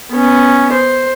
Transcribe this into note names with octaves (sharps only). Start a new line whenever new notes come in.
B3 C#4
C5